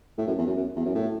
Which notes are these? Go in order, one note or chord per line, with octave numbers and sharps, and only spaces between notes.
A2
F#2
E2
F#2
F#2
E2
F#2
A2